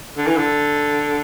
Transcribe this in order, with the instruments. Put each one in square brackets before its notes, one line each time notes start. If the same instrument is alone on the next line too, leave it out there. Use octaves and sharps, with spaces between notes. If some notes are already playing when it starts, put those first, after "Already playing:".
[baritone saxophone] D3
E3
D3